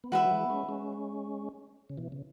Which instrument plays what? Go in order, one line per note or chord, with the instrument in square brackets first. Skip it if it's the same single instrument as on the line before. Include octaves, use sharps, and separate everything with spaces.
[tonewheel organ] B3
[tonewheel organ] E3 G#3 [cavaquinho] F#4 B4 E5 B5
[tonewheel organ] F#3
E3 G#3
B3
G#3 C#4
G#3 C#4
C#3
B2 E3
C#3